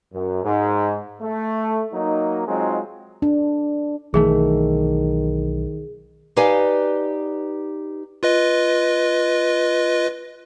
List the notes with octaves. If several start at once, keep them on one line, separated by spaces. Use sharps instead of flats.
F#2
G#2
A3
F#3 A#3 D#4
F#3 G#3 C4 D#4 F4
D4
B1 D#3 E3 A3 G#4
D#4 G4 B4 D5 F5 G#5
F4 B4 D#5